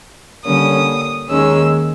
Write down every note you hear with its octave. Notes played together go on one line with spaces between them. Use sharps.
D3 G3 A#3 C#4 D#6
D#2 D#3 G#3 C#4 E6